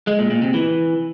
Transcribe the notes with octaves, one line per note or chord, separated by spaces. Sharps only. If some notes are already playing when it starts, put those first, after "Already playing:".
G#3
A#2
A#2
C3
E3